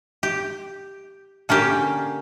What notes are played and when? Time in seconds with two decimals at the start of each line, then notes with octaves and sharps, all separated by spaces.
0.23 G4
1.49 D3 A#3 C#4 G4